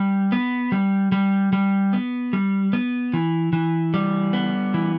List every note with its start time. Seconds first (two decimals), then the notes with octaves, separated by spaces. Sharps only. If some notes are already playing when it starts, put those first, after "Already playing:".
Already playing: G3
0.32 B3
0.72 G3
1.12 G3
1.53 G3
1.93 B3
2.33 G3
2.73 B3
3.13 E3
3.53 E3
3.94 G3
4.33 B3
4.74 E3